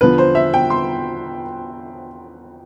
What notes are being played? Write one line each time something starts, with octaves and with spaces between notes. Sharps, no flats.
E2 D3 F3 B4
C5
E5
G5
C6